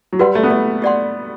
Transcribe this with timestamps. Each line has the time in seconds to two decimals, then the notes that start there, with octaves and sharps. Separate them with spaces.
0.13 F#3
0.19 G3 F#4 B4 F#5 C6
0.35 A3
0.43 B3
0.51 A3
0.82 G4 D5 F#5 C6